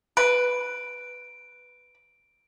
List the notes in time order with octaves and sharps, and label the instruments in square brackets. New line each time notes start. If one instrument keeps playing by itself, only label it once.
[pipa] B4 [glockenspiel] D7